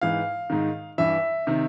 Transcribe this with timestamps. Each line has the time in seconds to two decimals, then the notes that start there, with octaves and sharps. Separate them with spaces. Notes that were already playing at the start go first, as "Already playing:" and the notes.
0.02 G#2 E3 F5
0.50 G#2 D#3
0.98 G2 E3 E5
1.47 C3 D#3